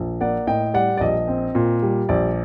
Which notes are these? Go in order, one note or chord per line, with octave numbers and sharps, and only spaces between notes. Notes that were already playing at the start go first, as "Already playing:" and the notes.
Already playing: A#1
A#3 D5 F#5
A2 D#5 G5
G3 D5 F#5
D5
A#1 D#5
C4
A#2
G3
A#1 D5